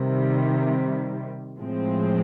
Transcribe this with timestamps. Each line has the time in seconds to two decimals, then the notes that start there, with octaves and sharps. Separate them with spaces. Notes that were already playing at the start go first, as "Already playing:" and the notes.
Already playing: C3 D#3 G3
1.59 A2 F3 G#3 C4